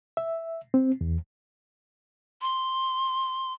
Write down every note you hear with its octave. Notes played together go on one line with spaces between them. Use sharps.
E5
C4
E2
C6